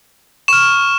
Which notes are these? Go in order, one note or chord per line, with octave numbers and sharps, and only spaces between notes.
C#6 F6 E7